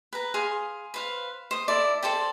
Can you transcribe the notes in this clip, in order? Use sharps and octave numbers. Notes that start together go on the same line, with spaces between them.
B4 A#5
G#4 F5 C6
B4 C5 F5
C5 D#6
E4 A4 D5
A4 C5 D5 G5